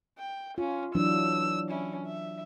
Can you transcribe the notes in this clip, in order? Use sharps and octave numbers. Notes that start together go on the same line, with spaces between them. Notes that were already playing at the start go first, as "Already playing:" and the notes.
G5
C#4 F4
E3 F#3 D4 E6
C#4 E4
E5